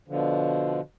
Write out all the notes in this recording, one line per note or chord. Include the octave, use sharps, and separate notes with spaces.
B2 D3 F3